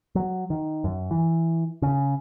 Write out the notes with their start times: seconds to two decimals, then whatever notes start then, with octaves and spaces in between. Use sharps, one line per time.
0.15 F#3
0.50 D#3
0.84 F#2
1.11 E3
1.82 C#3